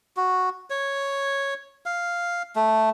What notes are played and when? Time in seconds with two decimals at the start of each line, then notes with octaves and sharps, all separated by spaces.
0.17 F#4
0.70 C#5
1.86 F5
2.56 A3